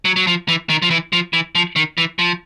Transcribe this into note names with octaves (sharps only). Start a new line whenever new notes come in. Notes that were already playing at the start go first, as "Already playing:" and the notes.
F#3
F#3
F3
E3
D#3
F3
E3
F3
E3
F3
D#3
E3
F3